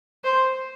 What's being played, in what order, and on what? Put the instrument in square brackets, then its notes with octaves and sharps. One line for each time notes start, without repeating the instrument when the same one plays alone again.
[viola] C5